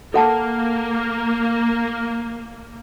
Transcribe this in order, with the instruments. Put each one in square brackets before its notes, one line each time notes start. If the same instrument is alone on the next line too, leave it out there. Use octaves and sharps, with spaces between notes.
[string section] A#3 [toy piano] A4 F#5 A5